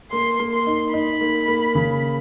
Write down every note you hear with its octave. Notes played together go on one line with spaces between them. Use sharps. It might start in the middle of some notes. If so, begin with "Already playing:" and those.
A#3 C6
A#3
C6
D#4
D#4 B5
A#3
A#3
C#3